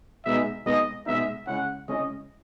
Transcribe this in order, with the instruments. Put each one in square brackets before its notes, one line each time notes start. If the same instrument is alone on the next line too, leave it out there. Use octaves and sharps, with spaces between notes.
[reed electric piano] B2 G#3 B3 D#4 [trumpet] E5
[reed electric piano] B2 G#3 B3 D#4 [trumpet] D#5
[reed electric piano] B2 G#3 B3 D#4 [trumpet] E5
[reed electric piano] C#3 G#3 C#4 E4 [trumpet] F#5
[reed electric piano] C#3 G#3 C#4 E4 [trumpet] D#5